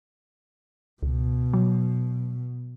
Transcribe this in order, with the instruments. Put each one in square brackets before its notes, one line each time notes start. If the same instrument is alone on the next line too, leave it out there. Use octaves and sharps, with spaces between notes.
[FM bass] C#2 [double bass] B2
[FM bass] F#3